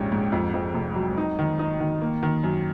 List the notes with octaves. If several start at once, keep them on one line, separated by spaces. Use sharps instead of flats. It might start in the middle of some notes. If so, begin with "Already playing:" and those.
Already playing: A#1 D#2 G#2 C#4
G#2
F2
F2
F1
F#3
D#4
D#3
D#4
D#3
A#3
D#3
F#2